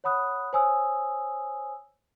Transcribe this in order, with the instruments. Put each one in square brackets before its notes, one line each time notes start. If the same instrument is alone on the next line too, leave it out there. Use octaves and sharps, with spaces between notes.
[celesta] C#5 F#5 B5 D#6 F#6
C5 C#5 G#5 D#6 E6